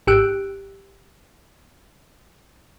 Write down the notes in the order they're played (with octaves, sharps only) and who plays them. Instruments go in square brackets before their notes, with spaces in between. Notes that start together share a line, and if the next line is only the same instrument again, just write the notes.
[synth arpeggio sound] G#1 G4 G5 E6 F#6 D7